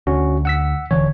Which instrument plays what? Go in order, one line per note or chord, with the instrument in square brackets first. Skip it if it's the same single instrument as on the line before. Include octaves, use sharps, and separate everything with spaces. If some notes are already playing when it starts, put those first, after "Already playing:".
[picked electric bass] D2 [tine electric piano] C#4 F#4
[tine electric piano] F#5 E6 B6
[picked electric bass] D#1 D3 E3 [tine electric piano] C#5